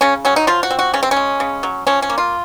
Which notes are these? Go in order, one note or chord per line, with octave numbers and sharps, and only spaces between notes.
C#3 C#4
F#3 C#4
D#4
F3 F4
F#4
C4
F#4
C#3 C#4
C4
C#4
G#3
C#3
F#3
F3 C#4
C#4
A#3
F4